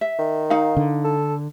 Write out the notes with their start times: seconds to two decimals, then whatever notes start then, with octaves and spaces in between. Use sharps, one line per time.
0.01 E5
0.19 D#3
0.50 D#4 F5
0.77 D3
1.05 A4